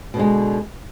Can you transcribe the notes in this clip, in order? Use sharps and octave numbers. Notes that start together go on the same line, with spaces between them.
B2 D3 G#3